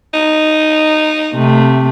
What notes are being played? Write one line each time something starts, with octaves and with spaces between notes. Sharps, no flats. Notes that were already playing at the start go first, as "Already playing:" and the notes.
D#4
C3 A3